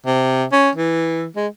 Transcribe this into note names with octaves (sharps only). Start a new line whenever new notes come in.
C3
C#4
E3
G#3